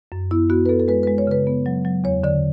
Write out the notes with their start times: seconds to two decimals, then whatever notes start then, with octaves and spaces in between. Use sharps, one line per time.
0.12 F#2
0.31 B3 E4
0.50 B3 F#4
0.66 B4
0.69 B3 A4
0.80 A4
0.88 G#3 B4
1.03 B4
1.07 G#3
1.18 C#5
1.27 C#3 B4
1.47 B3
1.66 F#3
1.85 F#3
2.04 E2 C#5
2.24 D3 D5